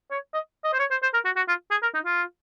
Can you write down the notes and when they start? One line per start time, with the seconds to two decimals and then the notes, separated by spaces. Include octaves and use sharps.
0.11 C#5
0.34 D#5
0.64 D#5
0.73 C5
0.79 C#5
0.91 C5
1.02 C5
1.13 A#4
1.25 F#4
1.36 F#4
1.48 F4
1.71 G#4
1.82 A#4
1.94 D#4
2.05 F4